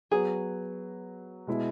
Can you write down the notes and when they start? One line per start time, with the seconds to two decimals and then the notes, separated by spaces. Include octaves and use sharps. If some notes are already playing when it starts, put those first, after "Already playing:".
0.11 F#3 B3 F#4 G#4
1.47 B2 G#3 E4